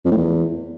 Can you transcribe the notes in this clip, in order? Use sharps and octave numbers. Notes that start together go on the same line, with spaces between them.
F2
A2
E2